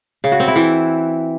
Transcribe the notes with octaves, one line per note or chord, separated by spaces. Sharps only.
C#3
F#4
C4
E4
E3